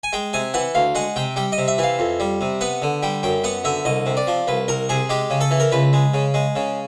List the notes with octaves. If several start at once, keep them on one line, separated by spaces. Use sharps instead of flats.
G#5
G#3 G5
C3 G#5
E3 F#5
D2 F5
G#3 F#5
C3 G5
G3 G5
D#5
C3
E5
E3 F5
F2
G3
C3
B3 F#5
D3
G3 G5
F#2 G5
B3 F#5
D3 E5
C2 D#5
C3
D5
F3
C2 B4
C2 A#4
C3 G#4
G#3 G4
C#3
A4
E3
A#4
C#2 B4
G#3
C#3
G#3
C#3